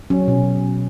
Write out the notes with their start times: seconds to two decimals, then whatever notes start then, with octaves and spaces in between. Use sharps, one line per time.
0.10 F#3 C#4
0.28 B2